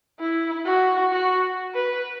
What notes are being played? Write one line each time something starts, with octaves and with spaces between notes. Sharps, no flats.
E4
F#4
F#4
B4